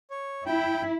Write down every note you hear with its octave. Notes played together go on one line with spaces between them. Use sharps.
C#5
E4 G5